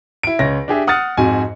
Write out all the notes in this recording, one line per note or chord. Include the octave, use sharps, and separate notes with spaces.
E4 D7
C#2 C#5 A#6
D4 G4 G#4 E5
F#5 D#6 F6 F#6 A6 C#7
F2 G#2 F#4 G#5